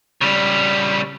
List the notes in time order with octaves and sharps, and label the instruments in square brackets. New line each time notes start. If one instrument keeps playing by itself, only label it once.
[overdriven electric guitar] C#3 G3